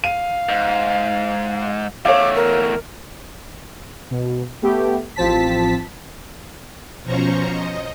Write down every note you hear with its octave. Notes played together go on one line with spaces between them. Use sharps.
F5 D#7
G#2
E2 A3 C#5 F5 D6
A#4
B2
A3 B3 G4
A1 F3 C4 A5 B6
B2 F3 C#4 C5 A#5 C#6
D#5